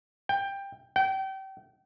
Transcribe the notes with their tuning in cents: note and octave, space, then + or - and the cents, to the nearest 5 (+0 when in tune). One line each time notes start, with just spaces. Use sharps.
G5 +15
G5 -30